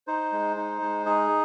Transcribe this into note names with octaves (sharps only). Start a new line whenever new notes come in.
D#4 C5
G#3
D#4
G#3
D#4 G#4